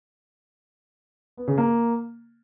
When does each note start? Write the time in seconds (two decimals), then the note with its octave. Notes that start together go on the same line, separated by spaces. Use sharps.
1.37 B3
1.48 C#3
1.58 A#3